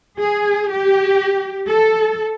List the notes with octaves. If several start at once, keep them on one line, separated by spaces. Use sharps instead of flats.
G#4
G4
A4